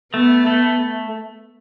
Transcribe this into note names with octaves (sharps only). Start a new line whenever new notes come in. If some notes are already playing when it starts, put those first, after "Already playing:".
A3 B3
A3